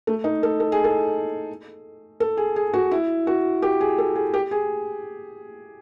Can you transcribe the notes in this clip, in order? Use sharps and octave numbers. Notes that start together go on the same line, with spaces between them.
A3
D#4
A4
A4
G#4
A4
A4
G#4
G#4
F#4
E4
F#4
G4
G#4
A4
G#4
G4
G#4